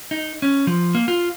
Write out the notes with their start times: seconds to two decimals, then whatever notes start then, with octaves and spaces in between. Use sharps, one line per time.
0.11 D#4
0.42 C#4
0.67 F3
0.95 A#3
1.08 F4